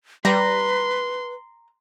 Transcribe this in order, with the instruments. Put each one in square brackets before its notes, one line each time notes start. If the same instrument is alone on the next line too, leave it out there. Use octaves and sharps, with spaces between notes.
[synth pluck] G3 [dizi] B4 [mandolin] A#5 [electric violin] C6